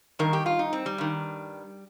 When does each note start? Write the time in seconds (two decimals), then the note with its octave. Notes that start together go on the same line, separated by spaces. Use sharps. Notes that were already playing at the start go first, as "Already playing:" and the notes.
0.19 G2 D#3 A#4
0.33 G4
0.46 F4
0.59 D#4
0.73 C4
0.86 G3
0.98 G2 D#3